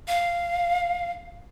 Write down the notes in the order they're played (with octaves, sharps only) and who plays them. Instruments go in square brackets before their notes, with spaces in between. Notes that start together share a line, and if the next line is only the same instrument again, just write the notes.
[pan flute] F5